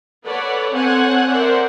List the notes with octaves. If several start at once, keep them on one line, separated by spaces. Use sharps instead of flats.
A4 B4 C#5 D5 F#5
C4 A4 C5 C#5 F#5 G#5
A#4 C5 D5 E5 F#5